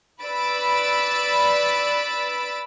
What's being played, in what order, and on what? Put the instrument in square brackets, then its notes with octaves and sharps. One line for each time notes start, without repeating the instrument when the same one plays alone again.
[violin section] B4 D5 B5 E6 A6 D7